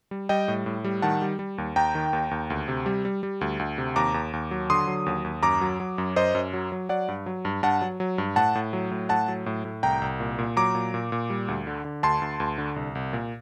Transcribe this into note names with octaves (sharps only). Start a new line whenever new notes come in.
G3
G3 D#5 G5
A2
A2
G3
D#3 F#5 A5
G3
G3
D#2
D#2 G5 A#5
D#3
D#2
D#2
D2
C3
G3
G3
G3
D2
D2
C3
D#2 A#5 D6
D#2
D#2
F#3
D3 C6 D#6
F#3
D#2
D#2
F#2 A#5 D6
F#3
F#3
F#2
F#2 C5 D#5
F#2
F#3
F#3
F#3 D5 F#5
G2
F#3
G2
G2 F#5 A5
F#3
F#3
G2
A2 F#5 A5
A2
F#3
A2
A2 F#5 A5
F#3
A2
A2
C2 G5 A#5
C2
A#2
A#2
F#3 A#5 D6
A#2
A#2
A#2
G3
D2
D3
D3
D2 A5 C6
D2
D2
D3
C2
C2
A#2